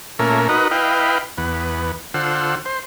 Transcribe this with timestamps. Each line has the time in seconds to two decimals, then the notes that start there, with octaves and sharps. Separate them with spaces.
0.19 A#2 A3 C#4 A#4 E5
0.49 D#4 F#4 A#4 B4 D#5
0.71 E4 B4 D#5 F5 G5
1.38 E2 B3
2.14 D3 F4 C5 F#5 E6
2.66 C5